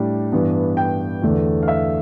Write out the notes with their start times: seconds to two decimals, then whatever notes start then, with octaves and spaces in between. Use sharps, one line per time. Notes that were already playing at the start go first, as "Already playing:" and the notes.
Already playing: A2 G3 D4
0.32 G2 E3 B3 D4
0.77 G5
1.22 E2 D3 A3 D4
1.63 F5
1.68 E5